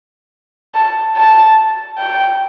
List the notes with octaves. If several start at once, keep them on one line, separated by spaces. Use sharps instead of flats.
A5
A5
G5